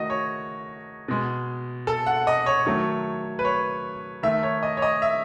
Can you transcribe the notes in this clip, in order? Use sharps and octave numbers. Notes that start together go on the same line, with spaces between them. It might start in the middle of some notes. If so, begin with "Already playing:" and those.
Already playing: D#3 A3 F#4 D#5
C#5
B2 G#3
A4
F#5
D#5
C#5
D#3 F#3 A3
B4
C#5
D#3 A3 E5
C#5
D#5
C#5
D#5
E5